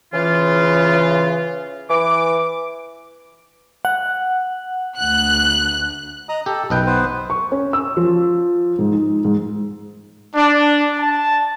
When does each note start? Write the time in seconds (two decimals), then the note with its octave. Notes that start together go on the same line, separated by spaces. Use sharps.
0.13 C#3 E3 F4
1.89 E3 D6
3.85 F#5
4.99 D2 F#6
6.29 D#5 A#5 D#6
6.46 G4 A4
6.70 B1 F#2 B4 D#5 G5
6.86 B3 B4 C5
7.30 C#6
7.52 C#4
7.73 E6
7.97 F3
8.79 G#2
8.93 D#4
9.25 G#2
10.35 D4
10.98 A5